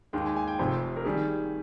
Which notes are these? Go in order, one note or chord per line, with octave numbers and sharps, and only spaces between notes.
D#2 D#3 G#3 G5
G#5
G#5
G5
F1 F2 C3 C5
A#4
D#3 G3 G#4